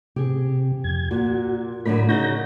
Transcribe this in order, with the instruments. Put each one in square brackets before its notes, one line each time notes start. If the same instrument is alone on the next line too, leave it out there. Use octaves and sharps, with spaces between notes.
[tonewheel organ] C3 [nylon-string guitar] G4 G#4
[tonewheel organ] F2 G#6
[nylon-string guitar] A#2 [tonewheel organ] F#4
[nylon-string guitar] A2 D3 F#3 [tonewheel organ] A#4 B5
[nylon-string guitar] C#3 D#4 F#4 [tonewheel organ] G6 A#6